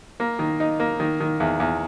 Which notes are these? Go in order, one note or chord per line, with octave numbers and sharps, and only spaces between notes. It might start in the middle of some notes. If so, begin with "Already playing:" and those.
A#3
D#3
D#4
A#3
D#3
D#3
E2
E2